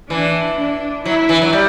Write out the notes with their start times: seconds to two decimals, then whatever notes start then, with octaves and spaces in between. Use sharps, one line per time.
0.10 E3 D4
0.59 D4
1.05 F#3 E4
1.29 E3
1.42 F#3
1.53 G3